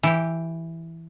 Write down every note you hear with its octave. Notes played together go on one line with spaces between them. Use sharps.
E3 G4